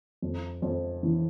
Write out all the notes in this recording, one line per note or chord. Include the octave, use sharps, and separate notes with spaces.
F2
F2
E3